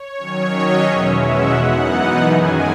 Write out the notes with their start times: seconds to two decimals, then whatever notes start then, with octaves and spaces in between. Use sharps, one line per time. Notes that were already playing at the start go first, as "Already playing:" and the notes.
Already playing: C#5
0.17 D#3 F#3 C#4
0.51 D#5
0.85 E2 B2 G#3 C#4 E5
1.19 F#5
1.53 F#2 E3 B3 D#4
2.22 F#2 D#3 G#3 G#5